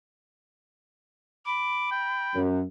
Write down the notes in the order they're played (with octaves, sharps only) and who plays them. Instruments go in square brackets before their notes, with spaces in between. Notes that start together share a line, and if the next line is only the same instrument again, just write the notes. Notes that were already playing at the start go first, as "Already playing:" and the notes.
[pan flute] B5 [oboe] D6
[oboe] G5
[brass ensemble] F#2